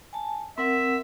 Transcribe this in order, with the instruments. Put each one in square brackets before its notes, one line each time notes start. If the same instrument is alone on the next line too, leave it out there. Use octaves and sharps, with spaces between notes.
[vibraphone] G#5 A5
[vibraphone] C4 A#4 F#5 [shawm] E5